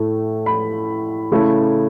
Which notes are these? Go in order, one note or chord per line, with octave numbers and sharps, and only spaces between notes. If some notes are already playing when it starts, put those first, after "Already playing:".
Already playing: A2 A3 E4
B5
C#3 A3 E4